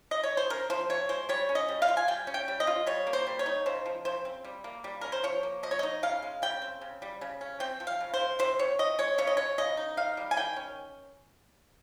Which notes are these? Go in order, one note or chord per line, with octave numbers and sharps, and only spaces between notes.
D#5
C#5
C5
C#4 A#4
F3 C5
C3 C#5
G#3 C5
G3 C#5
C#4
D#5
G3
F5
F4
G#5
G3 G5
C#4
G5
G3
D#5
F4
G3 C#5
A#3
C5
G3
C#5
D#4
C#3 C5
F3
C#3 C5
C4
G3
A#3
G3
C#4 A#4
C5
F3 C#5
A#3
F3 D#5
C#5
D#4 D#5
C#3 F5
G#3
C#3 G5
C4
C#3
G3
C#3
C#4
C4 G5
F3
F5
C#3
C5
G#3
C3 C5
D#3 C#5
C3 D#5
G#3 C#5
C#3 C#5
D#5
G#3 C#5
C#3 D#5
D#4
D#3 F5
G3
G#5
D#3 G5
C#4